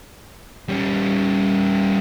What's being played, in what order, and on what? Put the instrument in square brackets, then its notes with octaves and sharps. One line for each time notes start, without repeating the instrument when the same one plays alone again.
[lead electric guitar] G3 C#4